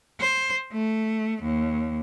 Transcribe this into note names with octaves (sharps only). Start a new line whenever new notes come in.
C5
A3
D#2